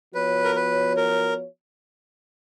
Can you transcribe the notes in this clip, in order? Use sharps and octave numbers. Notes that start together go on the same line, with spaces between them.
F3 B3 F#4 B4 C#5
A#4
B4
A#4